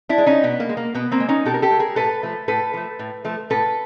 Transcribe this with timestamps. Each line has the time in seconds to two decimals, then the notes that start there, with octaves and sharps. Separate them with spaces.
0.09 D4 E4
0.18 G#3
0.26 C#4 D#4
0.43 B2 B3
0.60 A#3
0.69 G#3
0.77 A#3
0.95 B2 B3
1.12 A#3 C4
1.20 G#3
1.29 C#4 D#4
1.45 B2 G4 A4
1.54 A#4
1.62 G4 A4
1.71 G#3
1.79 G#4 A#4
1.96 A2 A4 B4
2.23 F3 A3
2.48 A2 A4 B4
2.74 F3 A3
2.99 A2
3.25 F3 A3
3.50 A2 A4 B4